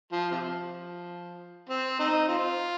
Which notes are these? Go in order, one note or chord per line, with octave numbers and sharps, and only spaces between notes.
F3
C3 F3
C4
C4 D#4
C4 F4